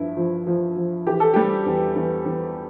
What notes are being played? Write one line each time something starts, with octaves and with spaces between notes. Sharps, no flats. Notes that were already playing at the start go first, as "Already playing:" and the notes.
Already playing: G2 F3 E4
F3
F3
F3
E3 G4
A4
G3 G4
E2
E2
E2